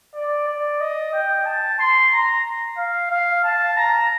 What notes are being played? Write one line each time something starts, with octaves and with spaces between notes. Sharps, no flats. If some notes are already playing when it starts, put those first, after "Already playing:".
D5
D5
D#5
G5
A5
C6
A#5
F5
F5
A5
A#5